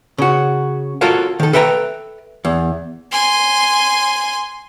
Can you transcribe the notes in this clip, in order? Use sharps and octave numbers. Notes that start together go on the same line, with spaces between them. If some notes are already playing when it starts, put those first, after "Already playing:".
C#3 F#4
F4 F#4 A4 A#4 C#5 F5
D#3 A4
A4 B4 E5 G5 A#5
E2
G#5 C6